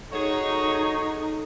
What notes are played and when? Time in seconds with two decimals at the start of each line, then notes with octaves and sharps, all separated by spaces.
0.12 D#4 F#4 G#4 A4 C#5